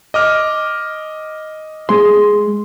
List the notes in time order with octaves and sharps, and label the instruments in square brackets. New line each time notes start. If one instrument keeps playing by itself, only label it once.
[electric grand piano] D#5 D6 F6
[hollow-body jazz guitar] G#3 C6